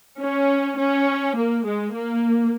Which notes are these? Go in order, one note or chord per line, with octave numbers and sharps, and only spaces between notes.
C#4
C#4
A#3
G#3
A#3